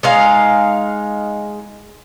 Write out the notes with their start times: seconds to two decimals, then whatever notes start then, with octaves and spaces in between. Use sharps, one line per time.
0.03 G#3 D#4 F5